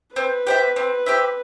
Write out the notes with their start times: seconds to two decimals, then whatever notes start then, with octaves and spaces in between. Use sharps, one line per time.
0.16 C4 B4
0.47 G4 C5 E5
0.76 C4
1.06 G4 C5 E5